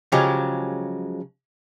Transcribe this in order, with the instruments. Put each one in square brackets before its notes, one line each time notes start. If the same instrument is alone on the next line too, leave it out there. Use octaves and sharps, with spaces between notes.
[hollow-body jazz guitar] C#3 F3 F#3 G#3 G4